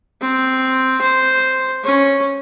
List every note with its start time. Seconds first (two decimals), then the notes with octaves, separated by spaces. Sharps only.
0.21 C4
1.01 C5
1.84 C#4